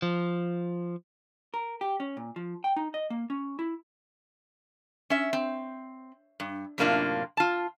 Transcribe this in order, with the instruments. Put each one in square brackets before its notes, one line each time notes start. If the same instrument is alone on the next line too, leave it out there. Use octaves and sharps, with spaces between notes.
[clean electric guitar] F3
[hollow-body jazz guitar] A#4
G4
C#4
A#2
F3
G5
D#4
D#5
A#3
C#4
E4
[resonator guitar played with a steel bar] C#4 E5
C4
G2
F#2 A2 C3 A#3 D4 F4
F4 A5